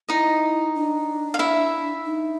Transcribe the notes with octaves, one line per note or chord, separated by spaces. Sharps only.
D#4 E4 D#5
D4
F5
E4 E5
D#4